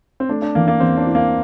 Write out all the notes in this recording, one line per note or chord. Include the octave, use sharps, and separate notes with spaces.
C4
A3 D4
D4
E3 A#3
A#3
E2 C4
D4
E4
A#3